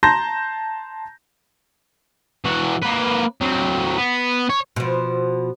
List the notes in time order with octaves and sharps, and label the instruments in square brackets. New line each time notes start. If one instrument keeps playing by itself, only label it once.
[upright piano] A5 A#5 C6 G6 A#6
[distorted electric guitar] E3 F#4
A#3 B4
F#3 C4
B3
C#5
[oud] B2 F3